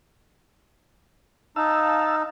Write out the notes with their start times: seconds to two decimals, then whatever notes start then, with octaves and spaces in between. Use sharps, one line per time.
1.56 D#4 F5 A5 E6